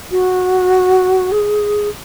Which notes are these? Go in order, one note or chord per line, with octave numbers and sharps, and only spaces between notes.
F#4
G#4